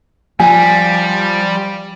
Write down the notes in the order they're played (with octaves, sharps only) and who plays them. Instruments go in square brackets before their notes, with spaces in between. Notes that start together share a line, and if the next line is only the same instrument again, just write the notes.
[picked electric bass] F3 [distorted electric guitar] G3 [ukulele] G#5